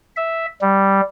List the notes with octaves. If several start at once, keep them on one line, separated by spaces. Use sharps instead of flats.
E5
G3